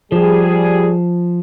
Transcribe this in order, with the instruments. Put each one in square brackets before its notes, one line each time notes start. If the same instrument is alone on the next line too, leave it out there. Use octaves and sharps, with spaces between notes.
[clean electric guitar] F3 [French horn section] G3 G#4